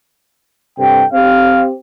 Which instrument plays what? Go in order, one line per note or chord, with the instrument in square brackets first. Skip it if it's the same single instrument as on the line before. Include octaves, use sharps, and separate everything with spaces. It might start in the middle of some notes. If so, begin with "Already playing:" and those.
[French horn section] G2 C3 A4 [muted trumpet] G5
[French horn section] C4 G4 [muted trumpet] F5